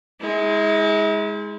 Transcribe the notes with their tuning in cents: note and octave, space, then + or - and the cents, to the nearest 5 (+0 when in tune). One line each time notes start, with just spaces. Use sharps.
G#3 +0 E4 -45